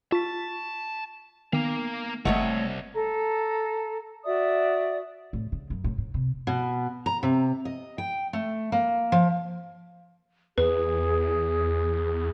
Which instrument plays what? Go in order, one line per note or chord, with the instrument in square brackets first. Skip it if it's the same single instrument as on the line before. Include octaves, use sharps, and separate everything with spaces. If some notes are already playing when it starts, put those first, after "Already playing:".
[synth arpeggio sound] F4 [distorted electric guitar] A5 [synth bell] C#6 B6
[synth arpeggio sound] D#3 [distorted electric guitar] A#3 F5 [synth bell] B3
[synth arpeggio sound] G1 G#3 [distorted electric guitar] C2 [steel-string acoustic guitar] A3 C#5 D#5 [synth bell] F#5
[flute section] A4 A#5
F#4 D5 E5 D#6
[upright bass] A2
C#3
F#2
A2
A2
C3
[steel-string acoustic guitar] B2
A#5
C3
D#5
G5
A3
A#3
F3
[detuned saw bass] E2 [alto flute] G#4 [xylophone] B4